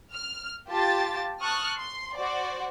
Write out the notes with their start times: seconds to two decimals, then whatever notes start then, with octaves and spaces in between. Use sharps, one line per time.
0.13 F6
0.70 F4 G4 A5 A6
1.41 A5 C#6 D#6 F6 F#6
1.77 C6
2.16 F#4 C5 D5